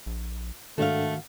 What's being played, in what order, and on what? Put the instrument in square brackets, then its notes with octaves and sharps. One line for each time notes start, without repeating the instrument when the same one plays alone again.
[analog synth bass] A#1
[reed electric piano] G#2 D4 A4 [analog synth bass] D#3 [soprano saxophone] A3 [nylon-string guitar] F#4 F5